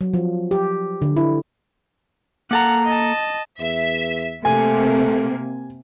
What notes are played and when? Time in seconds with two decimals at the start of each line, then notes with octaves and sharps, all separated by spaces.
0.01 F#3
0.14 F3
0.51 G4
1.02 D3
1.17 E4
2.51 A#3 A4 F#5 A#5
2.85 D#5 A5
3.61 E2 E5
4.45 C3 A3 A#3 G#5